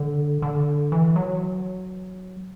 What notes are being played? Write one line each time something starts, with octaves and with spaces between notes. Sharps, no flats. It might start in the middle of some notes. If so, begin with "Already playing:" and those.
Already playing: D3
D3
E3
F#3